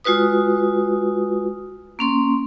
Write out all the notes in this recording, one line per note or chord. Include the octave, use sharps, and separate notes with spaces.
G#3 F4 F#4 B4 D#6
A#3 C#4 C6